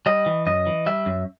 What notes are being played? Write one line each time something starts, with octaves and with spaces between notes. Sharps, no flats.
G3 D#5
E3
F#2 D#5
E3
G3 E5
F#2